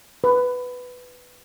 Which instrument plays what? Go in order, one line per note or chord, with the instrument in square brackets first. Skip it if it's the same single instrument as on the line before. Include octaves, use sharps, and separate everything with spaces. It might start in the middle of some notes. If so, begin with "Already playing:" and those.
[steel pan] B4